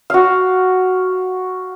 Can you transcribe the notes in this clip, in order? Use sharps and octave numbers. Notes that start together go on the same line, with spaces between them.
F#4 F5